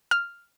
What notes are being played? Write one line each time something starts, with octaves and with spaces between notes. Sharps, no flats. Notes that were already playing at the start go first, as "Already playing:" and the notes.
F6